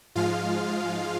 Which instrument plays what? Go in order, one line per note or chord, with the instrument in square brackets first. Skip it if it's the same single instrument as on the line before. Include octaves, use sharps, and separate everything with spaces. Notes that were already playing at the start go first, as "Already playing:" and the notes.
[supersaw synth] G#2 F3 G#3 F4 F5